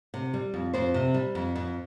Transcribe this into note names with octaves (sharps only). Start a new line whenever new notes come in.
C3
G3
F2
F2 C5
C3
G3
F2
F2